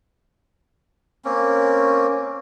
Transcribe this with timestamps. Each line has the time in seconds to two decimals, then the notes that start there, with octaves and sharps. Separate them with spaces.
1.25 A#3 C4 C#4